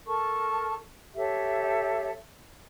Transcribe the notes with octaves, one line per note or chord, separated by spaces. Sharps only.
A4 A#4 A5 C#6
G4 A4 C#5 E5